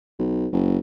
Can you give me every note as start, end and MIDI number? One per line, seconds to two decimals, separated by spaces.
0.19 0.48 35
0.53 0.78 30